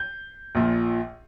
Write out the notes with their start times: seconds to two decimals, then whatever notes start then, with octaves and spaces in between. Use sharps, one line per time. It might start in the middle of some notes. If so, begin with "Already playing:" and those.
Already playing: G6
0.55 A#1 A#2 F3